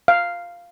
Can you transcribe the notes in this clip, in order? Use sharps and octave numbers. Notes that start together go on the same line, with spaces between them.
F5